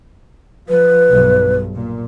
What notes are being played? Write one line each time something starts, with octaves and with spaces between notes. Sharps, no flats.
F3 B4
B1 G2
A#2